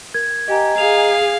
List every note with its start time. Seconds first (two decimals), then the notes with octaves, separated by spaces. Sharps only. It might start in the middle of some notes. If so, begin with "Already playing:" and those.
0.14 A#4 G#6
0.48 G4 D#5 G#5 A#5
0.78 G#4 F5 F7